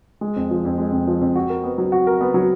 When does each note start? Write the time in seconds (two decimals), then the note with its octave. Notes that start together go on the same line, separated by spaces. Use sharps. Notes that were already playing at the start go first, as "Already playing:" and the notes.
0.21 G#3
0.36 F2
0.51 F3
0.65 F2
0.78 G#3
0.92 F2
1.07 F3
1.21 F2
1.36 F#4
1.50 A#4
1.64 B3
1.78 F#3
1.92 F#4
2.07 A#4
2.21 B3
2.34 F#3